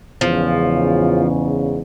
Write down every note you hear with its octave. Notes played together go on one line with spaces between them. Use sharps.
E2 G#2 C#3 F3